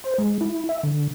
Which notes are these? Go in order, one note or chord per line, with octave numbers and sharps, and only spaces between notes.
C5
G#3
E4
E5
D3